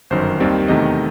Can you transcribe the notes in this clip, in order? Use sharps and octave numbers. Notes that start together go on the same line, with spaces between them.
G1 F#2 D#3 C5
D#2 D#3 G3 C4
E2 C3 D#3 A3 D#5